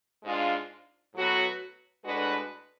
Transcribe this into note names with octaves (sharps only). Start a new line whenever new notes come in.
G#2 G#3 D4 F4
A2 F#3 B3 F#4 B4
A2 G#3 D4 F#4 B4